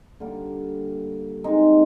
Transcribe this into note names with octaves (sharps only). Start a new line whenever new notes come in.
D3 G3 A#3
G#3 C4 D#4